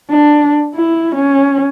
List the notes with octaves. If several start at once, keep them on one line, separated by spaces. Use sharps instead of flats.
D4
E4
C#4